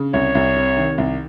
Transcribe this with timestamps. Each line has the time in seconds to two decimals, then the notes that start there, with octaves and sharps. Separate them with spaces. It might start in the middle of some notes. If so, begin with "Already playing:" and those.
Already playing: C#3
0.13 C2 C#5
0.35 C2
0.56 C3
0.77 D#3
0.98 C2